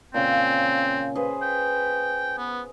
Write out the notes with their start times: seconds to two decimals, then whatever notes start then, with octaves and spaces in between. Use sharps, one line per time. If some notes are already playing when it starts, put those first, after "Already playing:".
0.14 A#2 C#3 C4 F5
1.15 G#4 B4 C5
1.42 G5
2.38 B3